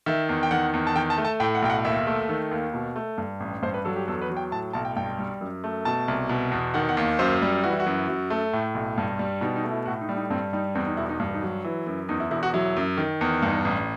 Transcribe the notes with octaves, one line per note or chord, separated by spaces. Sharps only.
D#3 E5
E2
G5
D#3 F#5
E2
A5
D#3 G5
A5
A3
A5
A2 G5
F#5
B1 G5
F#5
D#2 E5
A3
D#3
D#2
B2
A3
G2
A1
G2 C5
B4
F#3 A4
G4
E2 A4
B4
F#3
G5
A2 A5
B1 A5
G5
G2 G5
G3
F#2
A3
B2 A5
C2
B2
E2
D#3 F#5
F#5
D#2
F#2 C5
G3
E3 F#4
E4
F#4
F#2
F#2
A3
A2
B1
G2
G3
B2 D#4
D#4
A3
E4
A2 F#4
D#4
G3
D#4
G2 C4
G3 D#4
E2 C4
D#4
E1 E4
D#4
G2
D#4
F#3
E3
F#2
E2 D#4
E4
E1 E4
F#4
F#3 E4
F#2
D#3
E2
G2 D#4
A1